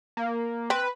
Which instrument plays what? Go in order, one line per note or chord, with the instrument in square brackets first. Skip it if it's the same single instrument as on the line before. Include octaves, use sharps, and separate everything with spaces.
[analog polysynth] A#3
[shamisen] C4 [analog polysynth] B4